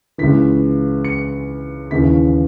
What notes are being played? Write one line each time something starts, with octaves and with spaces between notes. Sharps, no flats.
C#2 C#3 E3 B6
C#7
D#2 C#3 E3 B6